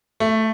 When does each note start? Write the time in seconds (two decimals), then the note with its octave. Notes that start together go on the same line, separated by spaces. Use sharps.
0.20 A3